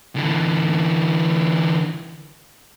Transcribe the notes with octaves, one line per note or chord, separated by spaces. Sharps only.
D3 E3